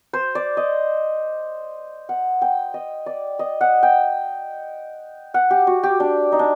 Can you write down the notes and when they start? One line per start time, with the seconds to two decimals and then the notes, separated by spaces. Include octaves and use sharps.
0.13 C5
0.35 D5
0.57 D#5
2.09 F#5
2.42 G5
2.74 D#5
3.06 D5
3.39 D#5
3.61 F#5
3.83 G5
5.34 F#5
5.51 G4
5.67 F#4
5.83 G4
6.00 D4
6.32 D#4
6.39 D4